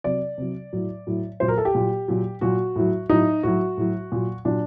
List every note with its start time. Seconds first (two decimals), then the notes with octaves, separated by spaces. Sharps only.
0.04 C3 F#3 D5
0.38 C3 F#3
0.73 A2 F#3
1.07 A2 F#3
1.40 A#2 F#3 C5
1.48 A#4
1.58 A4
1.65 G4
1.75 A#2 F#3
2.08 A#2 F#3
2.41 A#2 F#3 F#4
2.76 A2 F#3
3.10 A2 F#3 D#4
3.43 A2 F#3 F#4
3.77 A2 F#3
4.12 A#2 F#3
4.45 A#2 F#3 D4